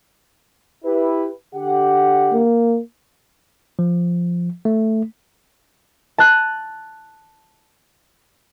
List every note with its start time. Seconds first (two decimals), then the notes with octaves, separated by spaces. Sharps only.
0.85 E4 G4 B4
1.54 D3 G4 F#5
2.33 A#3
3.79 F3
4.65 A3
6.18 A5 F#6 D#7